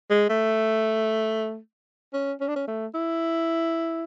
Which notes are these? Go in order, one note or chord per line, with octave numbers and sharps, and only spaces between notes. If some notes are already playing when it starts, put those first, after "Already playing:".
G#3
A3
C#4
C#4
D4
C#4
A3
E4